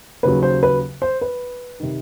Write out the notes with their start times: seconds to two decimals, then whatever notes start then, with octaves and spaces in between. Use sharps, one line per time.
0.23 D#2 C#3 F#3 B4
0.43 C5
0.63 B4
1.02 C5
1.21 B4
1.80 C3 D#3